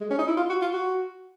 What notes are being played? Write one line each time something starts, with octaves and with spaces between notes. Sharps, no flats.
G#3
C#4
D#4
E4
F4
F#4
F4
F#4